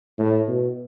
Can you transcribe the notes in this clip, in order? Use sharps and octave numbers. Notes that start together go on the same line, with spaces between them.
A2
B2